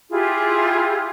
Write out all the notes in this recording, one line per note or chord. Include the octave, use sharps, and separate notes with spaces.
E4 F4 G4 G#4